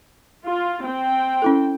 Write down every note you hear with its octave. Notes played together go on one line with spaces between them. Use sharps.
F4
C4 G5
C#4 E4 A4